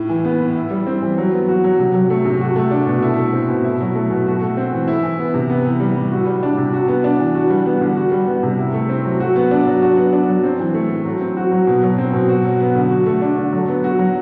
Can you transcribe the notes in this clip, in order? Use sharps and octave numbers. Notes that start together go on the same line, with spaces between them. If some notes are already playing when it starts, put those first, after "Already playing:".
Already playing: A2
E3
B3
A2
E4
G3
C4
E3
F#3
B3
F#4
F#3
C3
F#3
A3
C3
F#4
A3
D4
B2
E4
A3
C4
B2
E4
F#3
A3
B2
F#4
A3
C4
E3
E4
E3
B3
C3
B3
E3
G3
A2
F#4
G3
D4
C3
F#4
B3
D4
E3
F#4
G3
B3
D3
F#4
G3
B3
C3
E4
A3
C4
F#3
F#4
B3
D4
F#3
F#4
B3
D4
F#3
C4
E3
A3
A2
F#3
C4
F#4
F#3
B2
F#3
C4
B2
F#4
F#3
B3
D3
F#4
A3
D4
D3
F#3
B3
F#4
F#3